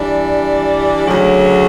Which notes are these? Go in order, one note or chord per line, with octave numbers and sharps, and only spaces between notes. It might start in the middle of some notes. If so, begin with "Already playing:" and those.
Already playing: E3 G3 D4
D2 C#3 F#3